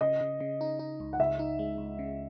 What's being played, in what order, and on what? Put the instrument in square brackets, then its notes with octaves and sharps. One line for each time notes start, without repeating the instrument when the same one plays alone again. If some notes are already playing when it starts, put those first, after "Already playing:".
[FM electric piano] C#3 [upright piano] D#5
[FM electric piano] C#3
C#3
D#4
D#4
C#2
[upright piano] F#5
[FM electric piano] C#2 [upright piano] E5
[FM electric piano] D#4
G#3
C#2
C#3